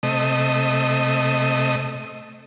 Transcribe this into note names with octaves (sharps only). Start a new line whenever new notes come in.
C3 A3 D#5